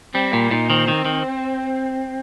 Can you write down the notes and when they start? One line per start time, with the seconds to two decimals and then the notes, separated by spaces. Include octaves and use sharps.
0.15 G3 C4
0.33 A#2 A#3
0.51 A#2 D#4
0.70 D#3 C4
0.88 D#3
1.05 D#3